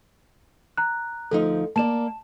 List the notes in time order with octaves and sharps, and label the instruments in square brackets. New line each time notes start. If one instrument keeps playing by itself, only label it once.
[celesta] A#5 F#6
[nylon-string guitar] D2 F3 D#4 [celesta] A4
[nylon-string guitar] A#3 D5 [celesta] A5 E7